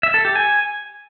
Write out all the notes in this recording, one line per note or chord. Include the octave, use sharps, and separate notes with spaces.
E5
A4
G4
G#5